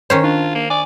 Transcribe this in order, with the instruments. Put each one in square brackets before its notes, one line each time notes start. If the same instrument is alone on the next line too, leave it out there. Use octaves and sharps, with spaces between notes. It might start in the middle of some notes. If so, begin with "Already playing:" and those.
[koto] D#3 C#4 C5 [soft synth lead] C#5
[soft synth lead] D4 [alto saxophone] F4
[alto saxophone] A#3
[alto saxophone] D5 [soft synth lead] G#5